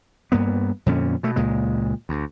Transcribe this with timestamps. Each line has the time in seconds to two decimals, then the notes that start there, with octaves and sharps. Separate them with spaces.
0.32 G2 A#3 B3
0.86 F2 A#2 D3 C#4
1.23 B2 A3
1.36 C#2 A#2 G#3
2.09 D2